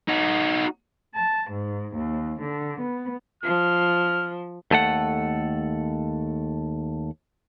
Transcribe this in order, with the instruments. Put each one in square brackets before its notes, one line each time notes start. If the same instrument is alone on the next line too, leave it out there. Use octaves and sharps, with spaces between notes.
[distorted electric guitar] D#4 F#4
[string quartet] A5
G#2
D#2
D3
B3
[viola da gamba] F3 [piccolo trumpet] F6
[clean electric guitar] D#2 A3 A4 F#5